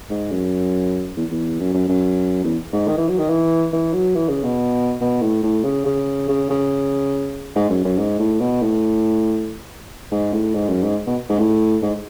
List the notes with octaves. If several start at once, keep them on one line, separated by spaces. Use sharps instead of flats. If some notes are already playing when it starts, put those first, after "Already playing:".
G#2
F#2
E2
E2
F#2
F#2
F#2
E2
G#2
D#3
E3
F#3
D#3
E3
E3
F#3
E3
C#3
B2
B2
A2
A2
C#3
C#3
C#3
C#3
G#2
F#2
F#2
G#2
A2
B2
A2
G#2
A2
G#2
F#2
G#2
B2
G#2
A2
G#2